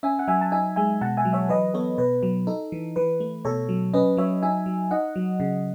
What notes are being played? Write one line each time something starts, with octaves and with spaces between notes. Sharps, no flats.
C#4 E5 G#5
F#5
F#3 E5 G#5
A5
D#4 E5 G#5
G#3 E5 G#5
B2 F#5 A5
E5 G#5
F#3
C#5 E5
E3 B4 D#5
B3 A4 C#5
B2 B4
F#3
D#4 A4
E3
E3 B4
A3
B2 A4 C#5
F#3
C#4 B4 D#5
F#3 C#5 E5
D#4 E5 G#5
F#3
D#4 D#5 F#5
F#3
C#3